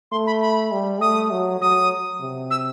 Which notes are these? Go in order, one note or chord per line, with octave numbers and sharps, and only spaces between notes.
A3 C6
B5
B5
G3
A3 D#6
F#3
F#3 D#6
C3
E6